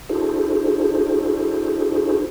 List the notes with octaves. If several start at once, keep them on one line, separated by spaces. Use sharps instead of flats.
D4 E4 F#4 G#4 A4 C5